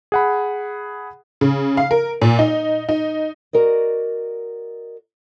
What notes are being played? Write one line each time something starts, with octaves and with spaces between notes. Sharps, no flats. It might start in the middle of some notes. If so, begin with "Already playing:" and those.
G#4 F#5 B5
C#3
F5
A#4
A#2
D#4
D#4
F#4 A#4 D5 D#5